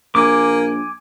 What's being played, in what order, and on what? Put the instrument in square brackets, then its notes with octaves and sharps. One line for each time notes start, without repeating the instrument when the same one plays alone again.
[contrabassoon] A#1 [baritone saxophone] A#3 [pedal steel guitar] G#5 D6